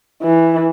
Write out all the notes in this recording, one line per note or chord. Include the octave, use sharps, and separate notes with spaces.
E3